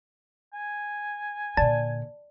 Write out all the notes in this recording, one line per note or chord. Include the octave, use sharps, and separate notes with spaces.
G#5
A#2 D3 D5 A5